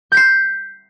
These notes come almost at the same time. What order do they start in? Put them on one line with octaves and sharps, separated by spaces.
G6 B6 C7